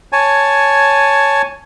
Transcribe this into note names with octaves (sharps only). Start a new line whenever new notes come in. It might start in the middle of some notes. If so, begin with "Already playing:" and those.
C#5 G#5 A5